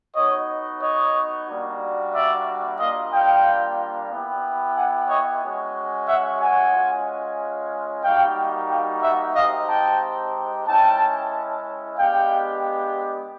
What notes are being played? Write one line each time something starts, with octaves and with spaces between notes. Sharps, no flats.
B3 D#4 F#4 C#5 D#5
C#5 D#5
G3 A#3 D4 F#4
D5 E5
G3 A#3 D4 F4 D#5 F5
F5 G5
B3 E4 G4
F#5 G#5
C#5 D#5
G#3 C#4 F#4
E5 F#5
F#5 G#5
G#3 C#4 F4
G3 A#3 D#4 F#4 F5 G5
F5 G5
E5 F#5
G#3 C4 D#4 G4 D#5 F5
G5 A5
G#3 C#4 E4 G5 A5
G#3 B3 D4 G4 F5 G5